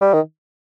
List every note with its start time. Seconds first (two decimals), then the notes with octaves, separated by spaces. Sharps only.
0.01 G3
0.13 D#3